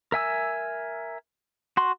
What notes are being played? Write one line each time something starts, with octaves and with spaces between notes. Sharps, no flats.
A#4 E5 G#5 E6
F#4 C6